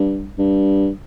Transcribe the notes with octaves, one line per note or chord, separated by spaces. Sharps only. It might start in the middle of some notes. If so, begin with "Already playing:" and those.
Already playing: G2
G2